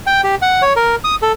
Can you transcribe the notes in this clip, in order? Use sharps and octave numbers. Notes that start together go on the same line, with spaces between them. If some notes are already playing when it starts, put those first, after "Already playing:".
G5
G4
F#5
C#5
A#4
D#6
A4